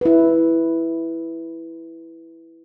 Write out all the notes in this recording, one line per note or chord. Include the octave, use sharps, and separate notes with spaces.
E4 B4